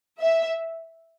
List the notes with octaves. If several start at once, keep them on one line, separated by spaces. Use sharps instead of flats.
E5